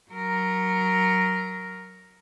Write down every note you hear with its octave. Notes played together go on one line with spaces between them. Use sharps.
F#3 A#4